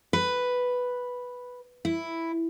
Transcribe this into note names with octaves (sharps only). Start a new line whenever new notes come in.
B4
E4